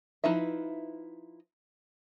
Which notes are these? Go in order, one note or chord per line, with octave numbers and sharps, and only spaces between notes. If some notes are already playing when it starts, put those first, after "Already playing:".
F3 D#4 E4 B4 E5